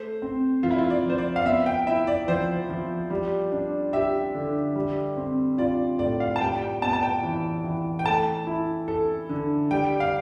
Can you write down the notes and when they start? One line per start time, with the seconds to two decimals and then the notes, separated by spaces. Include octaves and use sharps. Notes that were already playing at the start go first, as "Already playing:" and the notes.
Already playing: A3 C5
0.22 C4
0.63 F3 F4
0.71 E4
0.78 F4
0.90 D5
1.05 F3
1.10 C5
1.18 D5
1.36 F5
1.46 B3 E5
1.66 G5
1.87 E4 E5
2.07 D5
2.28 F3 C5
2.70 F3
3.10 G3
3.52 D4
3.93 G4 E5
4.34 D3
4.76 G3
5.17 C4
5.58 F4 D5
5.99 A2 D5
6.20 F5
6.36 A5
6.40 G3 G5
6.62 G5
6.82 B3 A5
6.93 A5
7.03 G5
7.23 E3
7.64 E3
7.99 G5
8.06 A3 A5
8.47 E4
8.88 A4
9.29 D3
9.71 G3 G5
10.00 F5